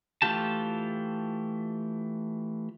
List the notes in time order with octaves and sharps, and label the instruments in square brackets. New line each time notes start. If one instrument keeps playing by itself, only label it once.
[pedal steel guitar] E3 A3 F4 G4 A5